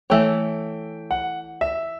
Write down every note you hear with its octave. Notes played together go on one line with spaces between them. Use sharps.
E3 A3 C#5 G5
F#5
E5